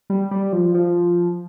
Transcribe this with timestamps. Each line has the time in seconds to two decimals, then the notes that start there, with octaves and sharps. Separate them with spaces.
0.10 G3
0.31 G3
0.53 F3
0.74 F3